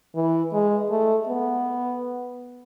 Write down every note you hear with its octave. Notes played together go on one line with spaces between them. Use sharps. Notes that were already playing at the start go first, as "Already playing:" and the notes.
E3
G#3
A3
B3